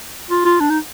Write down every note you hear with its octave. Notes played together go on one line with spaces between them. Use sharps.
F4
F4
D4
D#4